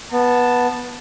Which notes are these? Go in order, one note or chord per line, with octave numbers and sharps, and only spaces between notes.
B3 A5